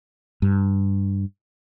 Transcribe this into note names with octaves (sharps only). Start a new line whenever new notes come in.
G2